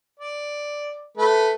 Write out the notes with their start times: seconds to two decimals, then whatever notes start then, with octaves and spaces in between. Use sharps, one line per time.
0.20 D5
1.18 A3 B4